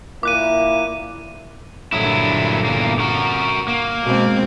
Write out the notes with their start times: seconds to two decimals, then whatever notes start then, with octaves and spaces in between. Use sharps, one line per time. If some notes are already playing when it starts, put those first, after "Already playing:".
0.23 A#2 A#3 E4 D6 F#6 D#7
1.92 G2 A#2 D3 F#3 E4
2.65 E2 A#3
2.99 F#4 A#4
3.68 A#3
4.02 B2 G#3 C4